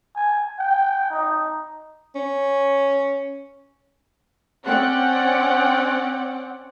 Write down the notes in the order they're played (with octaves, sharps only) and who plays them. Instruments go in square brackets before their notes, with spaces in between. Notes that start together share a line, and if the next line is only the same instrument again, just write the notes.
[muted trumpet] G#5
G5
D#4
[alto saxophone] C#4
[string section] C4 C#4 D5 F#5 G5